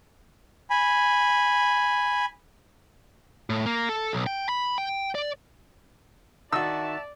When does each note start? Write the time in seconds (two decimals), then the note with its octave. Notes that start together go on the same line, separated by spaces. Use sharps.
0.70 G#5 B5
3.50 A2
3.66 A#3
3.89 A4
4.13 B1
4.26 G5
4.49 B5
4.78 G5
5.15 D5
6.52 D#3 F#4 D5 E5 A5 E6